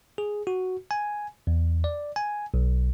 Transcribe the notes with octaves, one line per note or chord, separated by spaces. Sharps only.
G#4
F#4
G#5
E2
D5
G#5
B1